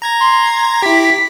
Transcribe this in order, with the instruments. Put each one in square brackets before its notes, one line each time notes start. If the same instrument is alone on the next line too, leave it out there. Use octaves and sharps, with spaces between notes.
[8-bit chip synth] A#5 G#6 A#6
[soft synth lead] C6
[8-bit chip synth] E4 G4 [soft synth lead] B6